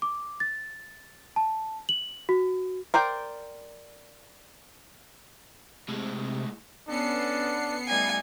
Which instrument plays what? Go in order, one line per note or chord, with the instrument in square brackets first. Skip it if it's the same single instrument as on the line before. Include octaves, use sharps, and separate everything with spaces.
[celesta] D6
A6
A5
F#7
F#4
[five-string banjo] A#4 C5 D5 G5
[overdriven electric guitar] A2 G#3 [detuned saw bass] C3
[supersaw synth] B3 C7 C#7 [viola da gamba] C#4 A4 [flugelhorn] D4
[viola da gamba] G3 A3 D#4 [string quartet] G#5